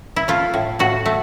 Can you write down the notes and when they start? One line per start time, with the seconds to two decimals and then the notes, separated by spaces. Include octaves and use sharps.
0.16 E4
0.28 A3 F4
0.54 A2
0.79 A2 F#4
1.05 A3